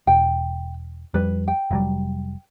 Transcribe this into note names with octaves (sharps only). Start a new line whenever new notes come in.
E1 G5
F2 G3 B4
G5
F1 F#3 G3